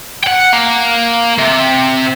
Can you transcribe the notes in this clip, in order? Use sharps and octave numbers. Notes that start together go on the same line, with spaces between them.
F#5 G5
A#3
C3